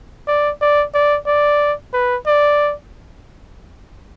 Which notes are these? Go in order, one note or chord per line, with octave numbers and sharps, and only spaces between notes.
D5
D5
D5
D5
B4
D5